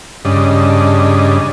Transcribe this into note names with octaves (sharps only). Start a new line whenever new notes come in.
G2 C#3 D4 D#5